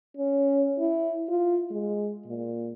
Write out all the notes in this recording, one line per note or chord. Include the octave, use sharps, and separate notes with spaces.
C#4
E4
F4
G#3
A#2